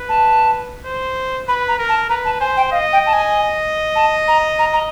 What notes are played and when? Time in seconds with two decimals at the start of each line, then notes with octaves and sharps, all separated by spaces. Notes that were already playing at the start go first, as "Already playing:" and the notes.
Already playing: B4
0.09 A5
0.86 C5
1.48 B4 B5
1.68 A#5
1.79 A#4
1.89 A5
2.09 B4 A#5
2.25 A5
2.41 C5 G#5
2.57 G5
2.72 D#5 F5
2.93 G5
3.07 A5
3.13 G#5
3.96 A5
4.28 A#5
4.59 A#5
4.73 A#5